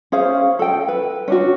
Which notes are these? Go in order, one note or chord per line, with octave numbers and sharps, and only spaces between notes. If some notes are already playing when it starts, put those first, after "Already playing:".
C#4 G#4 C5 F5
A4 G5
B4
C#4 D4 F#4